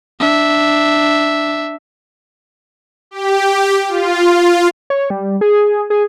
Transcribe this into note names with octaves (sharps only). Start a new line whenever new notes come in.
D4 E5
G4
F4
C#5
G3
G#4
G#4